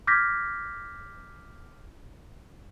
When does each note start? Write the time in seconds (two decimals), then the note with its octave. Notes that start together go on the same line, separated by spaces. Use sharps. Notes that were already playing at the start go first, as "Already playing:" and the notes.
0.07 D6 F6 G6 G#6 A#6 B6